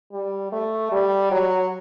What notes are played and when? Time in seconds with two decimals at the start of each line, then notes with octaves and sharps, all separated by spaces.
0.12 G3
0.52 A3
0.92 G3
1.31 F#3